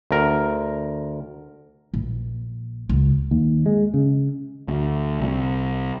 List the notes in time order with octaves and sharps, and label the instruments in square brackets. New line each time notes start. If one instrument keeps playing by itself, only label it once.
[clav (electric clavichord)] D2 A#4
[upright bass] A#1
C#2
[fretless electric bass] D#2
G#3
C#3
[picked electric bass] D2
C2